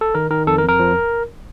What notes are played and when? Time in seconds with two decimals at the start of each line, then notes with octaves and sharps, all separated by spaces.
0.01 A4
0.15 D#3 A#4
0.30 D#3 A#4
0.47 F2 A4
0.58 A#4
0.63 F2
0.69 A#4
0.80 F3